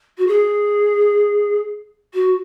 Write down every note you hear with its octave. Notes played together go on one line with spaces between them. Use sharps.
F#4
G#4
F#4